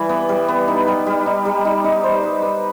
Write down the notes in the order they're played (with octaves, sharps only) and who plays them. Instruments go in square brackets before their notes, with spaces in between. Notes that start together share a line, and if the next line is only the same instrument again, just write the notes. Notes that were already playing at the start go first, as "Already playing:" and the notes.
Already playing: [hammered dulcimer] E3 G3
B3
G3
B3
D#4
G3
G3
D#4
G3
D#4
D#4
C5
B4
B4